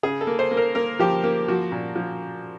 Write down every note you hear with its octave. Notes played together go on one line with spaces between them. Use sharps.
C#3 G#4
A4
A#3
C5
A#3
A#4
A#3 A#4
F3 G4
A#3
F3 F#4
A#2
F3